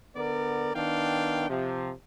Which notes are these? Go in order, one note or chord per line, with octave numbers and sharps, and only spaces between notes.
D3 B3 A#4 D5
D#3 B3 D4 F5 G5
C3 F3